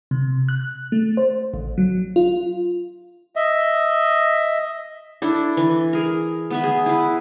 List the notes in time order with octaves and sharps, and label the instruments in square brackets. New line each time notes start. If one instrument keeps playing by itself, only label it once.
[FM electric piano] C3
F#6
A3
C5
A1
F#3
F4
[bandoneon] D#5 E5
[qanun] D4 E4 A4
E3
G#4 A#4
B3 B4 E5
G#4
E4 B4